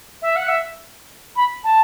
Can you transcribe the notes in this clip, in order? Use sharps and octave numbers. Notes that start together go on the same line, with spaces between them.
E5
F#5
E5
B5
A5